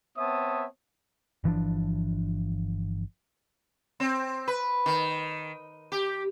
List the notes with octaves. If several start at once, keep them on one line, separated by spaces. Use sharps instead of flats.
B3 C4 C#5 E5 A5 D#6
G1 E3 F3 D4
C4
B4
D#3
G4